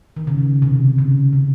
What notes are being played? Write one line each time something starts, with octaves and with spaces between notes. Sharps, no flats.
D#3
C#3
C3
C#3
C#3